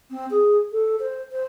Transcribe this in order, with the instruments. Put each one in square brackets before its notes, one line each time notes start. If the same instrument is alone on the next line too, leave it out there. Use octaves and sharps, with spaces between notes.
[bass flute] C4
G#4
A4
C5
C5